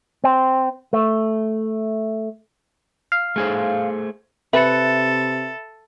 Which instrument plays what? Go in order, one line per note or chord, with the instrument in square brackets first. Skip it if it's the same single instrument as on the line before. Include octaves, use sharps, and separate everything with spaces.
[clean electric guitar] C4
A3
[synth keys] F5
[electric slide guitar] A3 G#4 C5
[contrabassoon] C3 [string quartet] A4 [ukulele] B4 [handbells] E5 B5 C#7